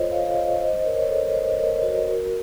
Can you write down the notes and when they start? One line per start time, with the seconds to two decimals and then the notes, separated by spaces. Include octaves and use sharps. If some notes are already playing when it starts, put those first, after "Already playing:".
Already playing: F4 A4 C5 C#5 D#5
0.11 C#5 F5
0.25 F5
0.36 C5 D#5
0.60 C5 D#5
0.85 A#4 C#5
1.02 C#5
1.09 A4 C5
1.34 C5 D#5
1.51 D#5
1.59 A#4 C#5
1.83 F#4 A#4
2.08 F#4 A#4